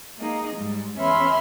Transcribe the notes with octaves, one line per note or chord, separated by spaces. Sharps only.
A#3 D#4 G#4 D#5
G#2 G3
E2 C#4 E5 B5 C6 F6